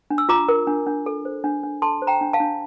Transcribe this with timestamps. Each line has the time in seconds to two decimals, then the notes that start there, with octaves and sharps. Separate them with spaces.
0.10 D4
0.18 E6
0.29 F4 A#5 D6
0.49 A#4
0.67 D4
0.86 D4
1.06 A4
1.25 C5
1.44 D4
1.63 D4
1.82 A4 A5 C6
2.02 C5
2.07 G5 A#5
2.21 D4
2.33 F5 A5
2.40 D4